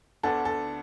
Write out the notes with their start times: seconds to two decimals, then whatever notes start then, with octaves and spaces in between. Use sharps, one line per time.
0.23 D2 D3 B3 D4 A4
0.45 A4